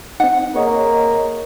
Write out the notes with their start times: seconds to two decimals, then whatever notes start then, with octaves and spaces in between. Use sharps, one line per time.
0.20 C4 D#4 F#5
0.55 A#3 G#4 C#5 D#5